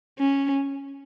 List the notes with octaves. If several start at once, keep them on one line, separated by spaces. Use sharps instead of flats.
C#4